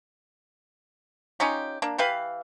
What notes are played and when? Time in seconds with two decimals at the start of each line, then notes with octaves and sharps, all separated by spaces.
1.40 C#4 D#4 F4 G4
1.82 A#3 D4
1.98 E3 G4 B4 F5